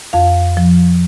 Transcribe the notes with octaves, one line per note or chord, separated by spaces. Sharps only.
F2 F5
F3